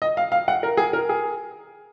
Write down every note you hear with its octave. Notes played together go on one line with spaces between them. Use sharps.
D#5
F5
F5
F#5
A#4
G#4
A#4
G#4